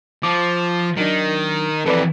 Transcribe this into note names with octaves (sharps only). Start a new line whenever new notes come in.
F3 D6
D#3 F#3 D4
F2 E3 A4 B4 D5